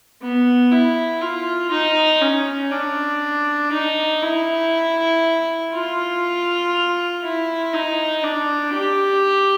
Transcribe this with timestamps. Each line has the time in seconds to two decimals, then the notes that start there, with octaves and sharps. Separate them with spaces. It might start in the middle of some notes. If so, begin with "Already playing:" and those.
0.22 B3
0.71 E4
1.21 F4
1.71 D#4
2.21 C#4
2.72 D4
3.72 D#4
4.22 E4
5.73 F4
7.24 E4
7.73 D#4
8.23 D4
8.73 G4